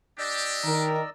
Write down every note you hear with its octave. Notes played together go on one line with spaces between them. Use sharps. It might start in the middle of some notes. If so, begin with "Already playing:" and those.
D4 G4 D5 D#5 E6
D#3 A#4